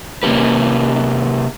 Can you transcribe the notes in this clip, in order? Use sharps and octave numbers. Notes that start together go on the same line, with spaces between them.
C3 A#3 C#4 G4 B4